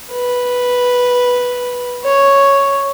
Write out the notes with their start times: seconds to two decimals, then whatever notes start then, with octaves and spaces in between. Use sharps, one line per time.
0.13 B4
2.04 C#5